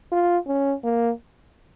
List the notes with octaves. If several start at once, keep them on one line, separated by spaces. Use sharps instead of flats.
F4
C#4
A#3